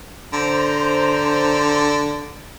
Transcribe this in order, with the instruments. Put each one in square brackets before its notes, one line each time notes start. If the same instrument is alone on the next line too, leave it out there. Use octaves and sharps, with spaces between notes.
[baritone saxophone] D3 [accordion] C5 A#5